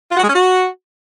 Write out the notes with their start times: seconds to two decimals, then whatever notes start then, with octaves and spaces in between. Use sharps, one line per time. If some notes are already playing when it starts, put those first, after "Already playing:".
0.11 F4
0.16 F#4
0.22 G#3
0.28 C#4
0.34 F#4